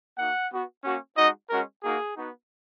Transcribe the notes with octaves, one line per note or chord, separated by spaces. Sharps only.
A#3 D#4 F#4 F#5
B3 F#4
A#3 C#4 F#4
G#3 D#4 F#4 D#5
G#3 C#4 F#4 A#4
A#3 D#4 F#4 G#4
B3 D#4 F#4